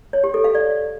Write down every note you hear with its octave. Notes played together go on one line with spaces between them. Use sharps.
C#5
G4
A4
F5
D5